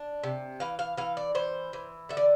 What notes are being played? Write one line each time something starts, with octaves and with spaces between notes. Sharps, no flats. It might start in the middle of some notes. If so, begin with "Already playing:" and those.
Already playing: D4
C3
E3 F5
F5
E3 F5
D5
E3 C5
E3
D3 E5
D5